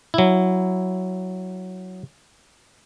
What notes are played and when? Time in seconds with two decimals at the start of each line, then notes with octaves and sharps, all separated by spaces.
0.14 F#3 E4